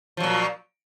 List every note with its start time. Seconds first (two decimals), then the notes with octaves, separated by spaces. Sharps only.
0.17 F3
0.20 F#3
0.23 A#2